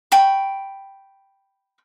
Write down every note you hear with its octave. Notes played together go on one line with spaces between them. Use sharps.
G5 B5 C#6